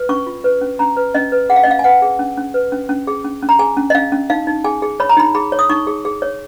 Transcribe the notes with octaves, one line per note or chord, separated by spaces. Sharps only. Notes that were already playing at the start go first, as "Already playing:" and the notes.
Already playing: B4
C#4 C#6
F4
B4
C#4
C#4 A#5
B4
C#4 D#5
B4
G#4 F#5
F5
D#5
C#4 F5
G#5
B4 F#5
G#4
C#4
C#4
B4
C#4
C#4
G#4
C#4
C#4
A#5
G#4 G#5
C#4
D#5
C#4 F5
C#4
D#4 F5
D#4
G#4 G#5
G#4
C#5 B5
A#5
D#4 B5
G#4 B5
C#5
D#6
D#4 C#6
G#4
G#4
C#5